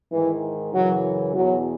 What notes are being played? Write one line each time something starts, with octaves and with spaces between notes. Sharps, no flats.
G#2 D#3 E3
F#2 C#3 E3 F#3
E2 B2 F#3